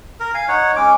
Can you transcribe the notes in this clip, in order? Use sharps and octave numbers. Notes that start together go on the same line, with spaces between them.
A#4
F5 G#5
D#4 C#5 F#5
G#3 C#4 D6